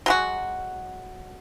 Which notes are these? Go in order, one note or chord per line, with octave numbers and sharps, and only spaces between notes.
F#3 G#3 F#4